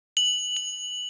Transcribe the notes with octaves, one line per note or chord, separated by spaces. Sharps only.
F#7
F#7